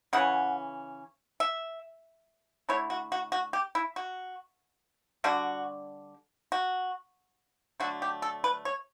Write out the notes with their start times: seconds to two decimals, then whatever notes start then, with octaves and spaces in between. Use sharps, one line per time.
0.13 C#3 E3 C#4 F#5
1.40 E5
2.69 D3 A3 E4 C#5
2.90 F#4
3.12 F#4
3.32 F#4
3.53 G4
3.75 E4
3.96 F#4
5.24 D3 G3 D4 F#4
6.52 F#4
7.80 D3 F#3 A3 D4 F#4
8.02 G4
8.22 A4
8.44 B4
8.65 C#5